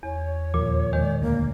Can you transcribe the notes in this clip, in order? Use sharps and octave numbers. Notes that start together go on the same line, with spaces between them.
E2 C#5
D#2 A#2 F3
B2 D#3 G#3
D2 A#3